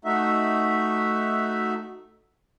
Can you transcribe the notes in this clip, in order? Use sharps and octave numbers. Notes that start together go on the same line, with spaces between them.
A3 D#4 F#4 E5